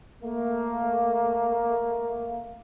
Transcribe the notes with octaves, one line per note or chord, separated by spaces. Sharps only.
A3 A#3